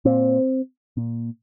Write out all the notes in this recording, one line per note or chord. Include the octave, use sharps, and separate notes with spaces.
A#2 C4
A#2